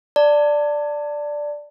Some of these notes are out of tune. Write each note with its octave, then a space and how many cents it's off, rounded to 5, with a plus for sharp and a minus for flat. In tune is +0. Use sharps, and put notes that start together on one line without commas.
D5 +0 A5 +25